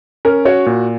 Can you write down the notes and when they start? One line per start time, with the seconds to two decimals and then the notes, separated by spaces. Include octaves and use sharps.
0.25 C#4 A#4
0.45 F#4 C#5
0.66 A#2